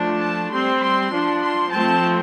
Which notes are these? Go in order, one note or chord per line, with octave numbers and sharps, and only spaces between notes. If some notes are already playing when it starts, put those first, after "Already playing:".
Already playing: F3 A3 D4
A5
G3 C4 C6
C6
F3 D4
C6
F3 A3 C4 A5